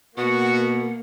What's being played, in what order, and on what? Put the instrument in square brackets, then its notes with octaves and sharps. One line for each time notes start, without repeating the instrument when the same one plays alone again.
[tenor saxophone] B2 [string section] A#3 [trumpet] F#4 [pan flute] F#5